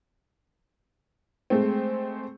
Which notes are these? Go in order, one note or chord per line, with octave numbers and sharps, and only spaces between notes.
G#3 A3 C4